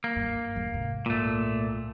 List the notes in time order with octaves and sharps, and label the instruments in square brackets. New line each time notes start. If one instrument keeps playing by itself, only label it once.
[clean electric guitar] A#3
[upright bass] G2
F2 G#2
C2 G#2
[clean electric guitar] A#2 A3